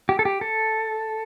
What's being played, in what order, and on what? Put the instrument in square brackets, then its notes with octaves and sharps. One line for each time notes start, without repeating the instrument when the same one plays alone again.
[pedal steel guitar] G4
A4
G4
A4